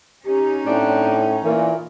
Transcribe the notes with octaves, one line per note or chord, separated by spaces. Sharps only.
C#4 D#4 G4
A2 C4 D4 E4
A#2 E3 A#4